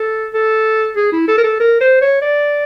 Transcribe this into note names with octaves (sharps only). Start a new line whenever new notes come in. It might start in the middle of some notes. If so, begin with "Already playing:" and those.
Already playing: A4
A4
G#4
E4
A4
A#4
A4
A#4
C5
C#5
D5